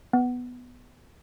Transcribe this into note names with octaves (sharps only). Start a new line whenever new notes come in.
B3